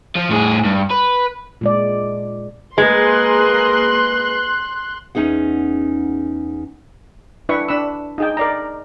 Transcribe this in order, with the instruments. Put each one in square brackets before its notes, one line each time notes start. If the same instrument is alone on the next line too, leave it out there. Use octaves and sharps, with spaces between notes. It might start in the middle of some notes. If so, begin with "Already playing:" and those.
[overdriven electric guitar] F3
A2 G#4
G2
B4
[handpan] A#2 G#3 D5
[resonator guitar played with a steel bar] G#3 [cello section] A#3 G#4 A#4 [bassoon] B4 [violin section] C6 F#6
[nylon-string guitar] E2 C#4 D#4 G#4 F#5
[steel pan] D4 E4 B4 E5 C#6
D4 B5 E6
D#4 G#4 G5
A#4 D5 A#5